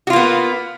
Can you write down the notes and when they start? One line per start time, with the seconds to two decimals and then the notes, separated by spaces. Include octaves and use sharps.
0.07 F#4
0.10 F4
0.13 A#3
0.16 B3